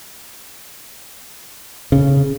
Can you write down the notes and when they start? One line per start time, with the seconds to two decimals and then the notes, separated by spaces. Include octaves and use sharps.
1.92 C#3